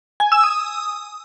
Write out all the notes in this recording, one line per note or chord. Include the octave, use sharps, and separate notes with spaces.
G#5
E6
D#6